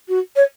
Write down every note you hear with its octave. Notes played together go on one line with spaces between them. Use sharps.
F#4
C#5